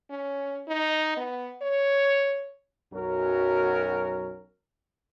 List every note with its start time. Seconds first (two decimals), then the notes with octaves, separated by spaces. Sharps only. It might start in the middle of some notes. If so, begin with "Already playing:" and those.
0.10 C#4
0.68 D#4
1.17 B3
1.62 C#5
2.93 B1 F#2 F#3 C#4 F#4 A#4